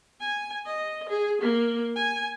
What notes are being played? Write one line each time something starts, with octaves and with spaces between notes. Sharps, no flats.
G#5
D#5
G#4
A#3
G#5